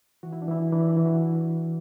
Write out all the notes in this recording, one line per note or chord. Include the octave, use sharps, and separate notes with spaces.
E3 F#4
E4
D4
E3 E4
E3 D4
E4
E3
F#4